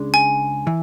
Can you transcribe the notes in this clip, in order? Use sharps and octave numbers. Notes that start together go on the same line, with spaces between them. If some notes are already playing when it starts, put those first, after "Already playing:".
Already playing: C#2 C#3 G#3 D4
G#5
E3